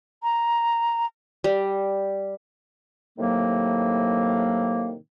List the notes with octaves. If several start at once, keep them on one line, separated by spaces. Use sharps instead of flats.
A#5
G3
A2 C3 D#3 F#3 A#3